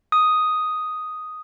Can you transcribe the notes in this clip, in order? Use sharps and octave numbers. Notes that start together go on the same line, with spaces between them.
D#6